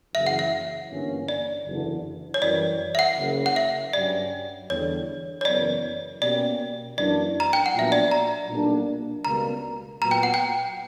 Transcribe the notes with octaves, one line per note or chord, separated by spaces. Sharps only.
F#1 F#2 C#3 E3 E5
F#5
E5
G1 G2 E3 A#3 C#4
D5
F#1 E2 D3
C#5
F#2 E3 G3 D5
E5
F#5
F#1 F#2 C#3
F#5
E5
G2 F#3 C#4 G4 D5
E2 D3 G3 C#5
C#5
F#1 F#2 E3 B3 D5
B2 A#3 C#4 G4 D5
F#2 E3 A#3 D4 D5
A#5
G5
F#5
A#1 A#2 F#3 B3 D4 E5
D5
A#5
B1 A#2 G3 A#3 D4
C#2 B2 G3 A#3 C#4 A#5
A#2 F#3 B3 A#5
G5
F#5
G5